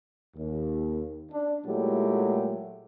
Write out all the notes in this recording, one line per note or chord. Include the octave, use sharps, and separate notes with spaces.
D#2
D4
A#2 F#3 G#3 A3 E4 G4